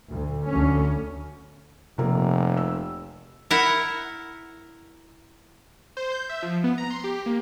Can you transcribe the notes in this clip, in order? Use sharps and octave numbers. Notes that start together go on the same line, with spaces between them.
D2
D2 C#4
F1 C3 F3 A#3
E6
E4 A#4 F#5
C5
G6
E5
F3
B3
A#5
C6
G4
A#3